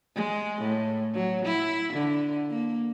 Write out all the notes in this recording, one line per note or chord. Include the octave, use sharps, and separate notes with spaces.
G#3
A2
F#3
E4
D3
A#3